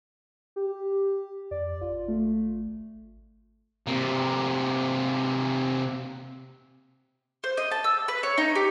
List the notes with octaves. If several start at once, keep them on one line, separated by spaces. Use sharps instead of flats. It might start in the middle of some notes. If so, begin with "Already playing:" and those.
G4
F2 D5
G#1 F4
A3
C3 A#3
C5
D#5
A5
E6
B4
C#5
D#4
G4